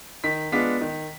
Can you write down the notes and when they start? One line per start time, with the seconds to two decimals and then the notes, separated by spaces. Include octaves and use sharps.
0.24 D#3 B6
0.52 G#3 B3 D4 F4 B6
0.81 D#3